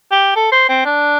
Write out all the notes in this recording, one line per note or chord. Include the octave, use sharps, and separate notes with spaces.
G4
A4
C5
C4
D4